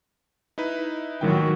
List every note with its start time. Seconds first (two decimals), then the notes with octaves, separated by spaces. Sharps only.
0.58 D#4 E4 B4
1.21 A1 A#2 D#3 F#3 F#4 G5